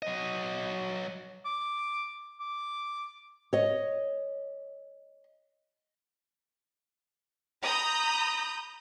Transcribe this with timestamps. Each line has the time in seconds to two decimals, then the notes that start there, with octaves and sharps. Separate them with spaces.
0.02 F#3 D#5
1.45 D6
2.40 D6
3.53 C#5 D#5
7.63 A#5 B5 D#6 G6